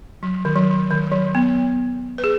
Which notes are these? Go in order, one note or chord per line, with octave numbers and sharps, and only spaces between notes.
F#3
D#3
F#3
D#3
F#3
B3
B4
G#4